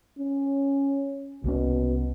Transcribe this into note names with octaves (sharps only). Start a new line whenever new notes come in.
C#4
C2 B2 A#3 C#4